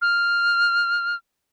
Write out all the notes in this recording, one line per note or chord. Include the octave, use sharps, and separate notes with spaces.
F6